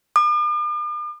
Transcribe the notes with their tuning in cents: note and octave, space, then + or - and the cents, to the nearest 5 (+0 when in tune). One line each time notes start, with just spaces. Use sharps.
D6 +45